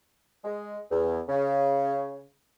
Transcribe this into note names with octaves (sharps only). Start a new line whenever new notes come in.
G#3
E2
C#3